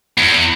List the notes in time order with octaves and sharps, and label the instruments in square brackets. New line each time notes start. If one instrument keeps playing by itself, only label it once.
[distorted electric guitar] E2